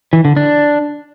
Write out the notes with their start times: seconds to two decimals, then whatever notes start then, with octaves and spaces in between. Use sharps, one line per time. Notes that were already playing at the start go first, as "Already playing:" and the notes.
0.13 E3
0.25 D3
0.37 D4